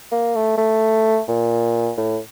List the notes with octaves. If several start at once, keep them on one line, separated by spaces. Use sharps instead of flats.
A#3
A3
A3
A#2
A2